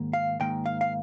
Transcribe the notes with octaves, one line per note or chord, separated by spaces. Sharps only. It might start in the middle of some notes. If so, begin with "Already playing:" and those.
Already playing: G#2 D#3 A#3
F5
G#2 D#3 A#3 G5
F5
F5